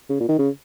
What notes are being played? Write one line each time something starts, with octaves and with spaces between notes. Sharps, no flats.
C#3
A#2
D#3
C#3